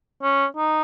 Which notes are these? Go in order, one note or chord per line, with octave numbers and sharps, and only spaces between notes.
C#4
D#4